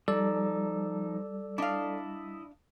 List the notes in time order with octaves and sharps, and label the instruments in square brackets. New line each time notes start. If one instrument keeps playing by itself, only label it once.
[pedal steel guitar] F3 D#4 [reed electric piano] G3 [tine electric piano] A4 D5 E6
[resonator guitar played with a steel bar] D4 F5 [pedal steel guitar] E4 D#5